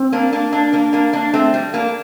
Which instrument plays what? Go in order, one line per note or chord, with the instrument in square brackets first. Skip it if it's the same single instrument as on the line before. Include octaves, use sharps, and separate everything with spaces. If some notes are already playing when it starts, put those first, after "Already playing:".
Already playing: [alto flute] C4
[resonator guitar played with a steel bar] A#3 D4
A#3 D4
A#3 D4
A#3 D4
A#3 D4
A#3 D4
A3 C4
G3
A#3 D4